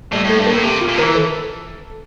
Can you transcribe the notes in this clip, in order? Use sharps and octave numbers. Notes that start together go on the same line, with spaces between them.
A2 G3
A2 A3
G2
A2 A#3
C3 G4
F4
A#2
E3 A#4
A4